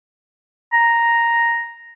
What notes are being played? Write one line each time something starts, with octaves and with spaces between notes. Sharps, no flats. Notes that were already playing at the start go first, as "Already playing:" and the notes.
A#5